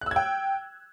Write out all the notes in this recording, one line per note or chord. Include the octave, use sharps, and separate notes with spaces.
G5 E6 F#6 G#6